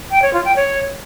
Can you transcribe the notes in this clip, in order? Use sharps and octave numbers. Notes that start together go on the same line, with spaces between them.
G5
C#5
F4
G5
C#5